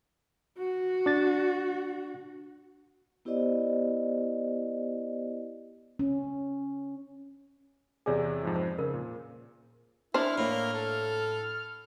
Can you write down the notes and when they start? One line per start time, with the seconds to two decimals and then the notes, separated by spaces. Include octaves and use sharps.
0.58 F#4
1.06 D4 A6
3.25 B3 E4 G4 C5 D5 D#5
5.99 C#4
8.06 E2 C3 G#4 C#5 D5 G#5
8.43 F2 G#2 F3
8.56 C5
8.79 C#3 A#4
8.94 A#2
10.14 D4 E4 C5 F6
10.38 A2 A#3
10.73 A4